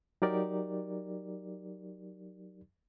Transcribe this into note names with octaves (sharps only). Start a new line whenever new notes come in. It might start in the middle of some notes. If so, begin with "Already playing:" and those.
F#3 D#4 G4 A#4 D5